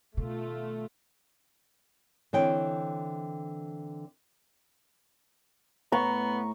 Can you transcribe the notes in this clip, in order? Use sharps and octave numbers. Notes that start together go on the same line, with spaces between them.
B2 D#3 A3 F4
D3 E3 C4 C#5 D#5 G5
A2 B3 A#5 C#6